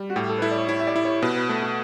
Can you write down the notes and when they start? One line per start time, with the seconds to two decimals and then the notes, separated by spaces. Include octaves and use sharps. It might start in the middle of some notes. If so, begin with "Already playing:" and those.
Already playing: G3
0.10 F#4
0.15 A2 G4
0.29 A4
0.38 B4
0.42 E4 A4
0.51 D5
0.56 C#5
0.69 E4 C#5
0.79 E5
0.87 D5
0.96 E4
1.05 C#5
1.22 B2 B4
1.35 B4
1.49 A3 B4
1.62 F#4